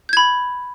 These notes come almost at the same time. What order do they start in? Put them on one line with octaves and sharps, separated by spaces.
G6 G#6 B5